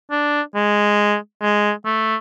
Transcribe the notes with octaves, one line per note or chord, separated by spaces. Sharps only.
D4
G#3
G#3
A3